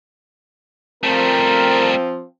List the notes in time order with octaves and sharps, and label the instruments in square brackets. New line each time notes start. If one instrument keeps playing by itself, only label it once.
[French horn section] F3 C4 [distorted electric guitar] G3 A3 [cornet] A#4